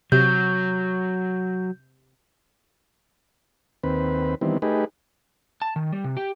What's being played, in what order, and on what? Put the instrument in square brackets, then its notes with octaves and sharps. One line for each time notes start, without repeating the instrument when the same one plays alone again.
[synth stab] C3 [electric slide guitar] F#3 [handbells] G6
[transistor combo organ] D#2 C4 B4
D#3 E3 G3 B3 C4
A3 D#4 G4 G#4 B4
[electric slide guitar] A5
D#3
G3
C3
G4